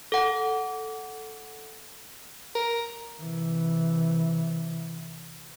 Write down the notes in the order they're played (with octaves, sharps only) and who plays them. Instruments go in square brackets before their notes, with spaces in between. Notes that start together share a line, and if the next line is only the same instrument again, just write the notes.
[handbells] A4 F#5
[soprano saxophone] A#4
[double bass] C3 E3